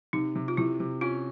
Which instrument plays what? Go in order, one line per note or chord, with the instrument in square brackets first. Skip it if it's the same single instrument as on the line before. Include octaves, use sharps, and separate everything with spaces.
[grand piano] C3 [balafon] D#4
[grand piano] C3
[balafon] F4
[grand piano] C3 [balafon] E4
[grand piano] C3
[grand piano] C#4 [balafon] F4